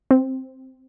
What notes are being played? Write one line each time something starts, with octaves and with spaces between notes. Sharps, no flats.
C4